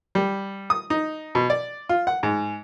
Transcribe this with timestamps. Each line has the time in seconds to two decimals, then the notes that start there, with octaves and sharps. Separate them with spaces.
0.15 G3
0.70 D#6
0.90 D#4
1.35 B2
1.50 D5
1.89 F4
2.07 F#5
2.23 G#2